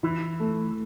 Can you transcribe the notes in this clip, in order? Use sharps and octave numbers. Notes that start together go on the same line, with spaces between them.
E3 E4
A3